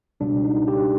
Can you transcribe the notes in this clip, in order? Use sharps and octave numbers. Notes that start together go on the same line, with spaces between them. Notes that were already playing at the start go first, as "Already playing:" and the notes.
C#2 B2 G3 D4
D#4
G4